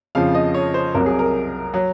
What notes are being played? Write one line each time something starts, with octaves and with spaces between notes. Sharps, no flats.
F2 C#3 F3 F5
D#5
C#5
C5
C2 C3 F#3 A#4
G#4
A#4
F#3